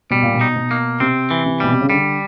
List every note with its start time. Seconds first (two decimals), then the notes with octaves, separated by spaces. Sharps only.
0.11 B2 G3
0.23 A#2
0.34 B2
0.41 D#4
0.56 B2
0.71 A#3
1.00 C3 C4
1.31 E3
1.46 C3
1.60 B2 G3
1.72 C3
1.81 C#3
1.90 D3 G3